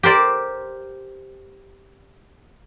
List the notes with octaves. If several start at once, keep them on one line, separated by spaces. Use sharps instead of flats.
G4 A#4 C5 D5